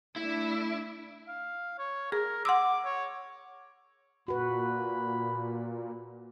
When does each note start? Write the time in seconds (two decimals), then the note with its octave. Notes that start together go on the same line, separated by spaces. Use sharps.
0.16 A3 D4 E4 E5
1.28 F5
1.79 C#5
2.12 G#4 A#4
2.45 F#5 C6 D6 E6
2.85 C#5
4.28 A#2 F#4 B4 B5